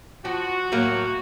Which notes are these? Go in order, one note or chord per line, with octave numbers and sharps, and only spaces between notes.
F3 F#4
A2 F#3 A#3